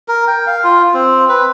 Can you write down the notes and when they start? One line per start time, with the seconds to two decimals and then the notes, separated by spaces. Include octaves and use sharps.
0.08 A#4
0.27 G5
0.47 F5
0.64 F4
0.94 C4
1.29 B4